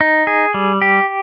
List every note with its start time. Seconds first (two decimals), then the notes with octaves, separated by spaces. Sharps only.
0.01 D#4
0.27 G#4
0.54 G3
0.82 G4